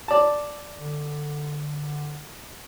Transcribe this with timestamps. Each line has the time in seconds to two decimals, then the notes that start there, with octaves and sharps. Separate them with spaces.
0.08 D5 A5
0.76 D3